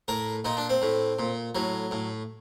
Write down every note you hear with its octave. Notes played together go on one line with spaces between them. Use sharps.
A2 A#4
A#2 D#4
D4
C4
A2
A#2
A2 F#3
A2